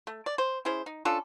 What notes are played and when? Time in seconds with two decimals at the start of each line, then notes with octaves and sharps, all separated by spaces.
0.07 A3
0.26 D5
0.38 C5
0.65 C#4 E4 G#4 C5
0.86 D#4
1.05 C#4 D4 F4 A4